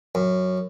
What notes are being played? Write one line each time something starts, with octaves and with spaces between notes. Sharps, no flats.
F#2